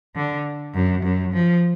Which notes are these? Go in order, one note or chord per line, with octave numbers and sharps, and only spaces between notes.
D3
F#2
F#2
F3